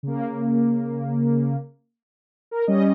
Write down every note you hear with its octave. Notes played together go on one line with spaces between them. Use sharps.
C#3 A#3
A#4
G3 C#4 D#5